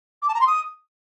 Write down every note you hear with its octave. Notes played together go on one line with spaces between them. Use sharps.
D6
A5
A#5
C6
D#6